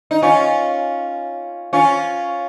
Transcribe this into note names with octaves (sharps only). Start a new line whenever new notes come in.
D#4
C#4 F4
C#4 F4